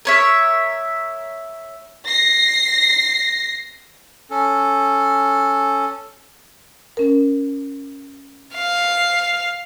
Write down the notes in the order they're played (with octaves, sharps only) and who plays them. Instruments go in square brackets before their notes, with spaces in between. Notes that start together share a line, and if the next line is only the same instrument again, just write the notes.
[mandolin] A#4 C#5 E5
[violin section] A#6 C7
[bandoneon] C#4 A4
[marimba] C#4 A#4
[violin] F5